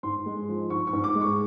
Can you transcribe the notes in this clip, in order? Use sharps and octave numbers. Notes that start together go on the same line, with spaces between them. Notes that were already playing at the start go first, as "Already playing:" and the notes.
G#2 C6
G#3
F3
G#2 C#6
C#6
G#2
D6
G#3
C#6